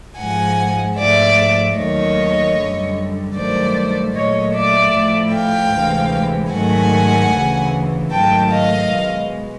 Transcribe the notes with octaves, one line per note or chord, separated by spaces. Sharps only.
G#2 F3 G#3 F#5 G#5
G#2 F3 A3 D5 E5
D#2 D#3 F#3 A3 C#5 D#5
F#2 D3 G3
G2 D#3 F#3 A3 C5 D5
A#2 F#3 A3 C#5 D#5
D5 E5
A2 F3 A3
F5 G5
D2 C3 E3 G#3
G#2 D#3 F#3 A3 F#5 G#5
D2 C#3 E3
G#2 D#3 F#3 A3 G5 A5
D#5 F5
B2 G#3